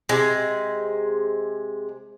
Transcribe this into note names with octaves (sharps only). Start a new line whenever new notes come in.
C3 G#3